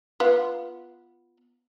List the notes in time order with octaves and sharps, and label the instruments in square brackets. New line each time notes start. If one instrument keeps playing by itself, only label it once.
[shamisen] B3 F4